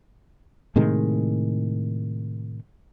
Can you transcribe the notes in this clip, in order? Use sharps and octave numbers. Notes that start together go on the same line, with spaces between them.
A2 C3 D#3 G#3